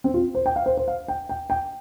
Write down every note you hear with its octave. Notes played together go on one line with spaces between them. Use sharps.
C4
F4
C5
G5
F5
C5
C5
F5
G5
G5
G5